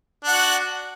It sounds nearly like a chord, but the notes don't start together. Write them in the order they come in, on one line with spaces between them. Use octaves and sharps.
D4 F#5 F#4